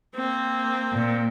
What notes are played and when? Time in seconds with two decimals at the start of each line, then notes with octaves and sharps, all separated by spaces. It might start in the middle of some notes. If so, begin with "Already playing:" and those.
0.16 A#3 C4
0.93 A#2